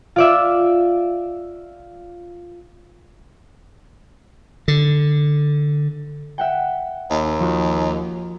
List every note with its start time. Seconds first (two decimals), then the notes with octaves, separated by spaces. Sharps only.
0.16 F4 D5 E5
4.68 D3
6.38 E5 F#5 G5
7.11 D#2
7.40 F3 F#4